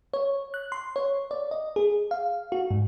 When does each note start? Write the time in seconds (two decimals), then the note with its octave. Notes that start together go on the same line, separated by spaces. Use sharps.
0.14 C#5
0.54 F#6
0.72 C6
0.96 C#5
1.31 D5
1.51 D#5
1.76 G#4
2.11 F5
2.52 F#4
2.71 G#2